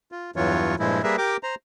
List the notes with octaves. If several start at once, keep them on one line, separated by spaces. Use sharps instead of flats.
F4
E2 G2 E3 F#3 F4 C#5
G2 A#2 F3 G#3 E4
G3 A#3 G#4 A#4 B4 E5
G4 A#4 G5 D6
C5 A#5